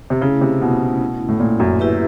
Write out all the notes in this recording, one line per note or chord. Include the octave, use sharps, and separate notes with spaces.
C3
C#3 A3 C#4 E4
C3
B2
A2
A#2
F#2
E4 G4 B4 E5